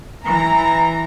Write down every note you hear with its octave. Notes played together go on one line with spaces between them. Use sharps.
E3 A#5